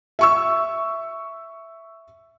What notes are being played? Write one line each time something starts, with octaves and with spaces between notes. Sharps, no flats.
E5 C#6 E6